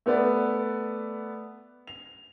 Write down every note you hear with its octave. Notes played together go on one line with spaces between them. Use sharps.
A3 B3 B4 D5
F7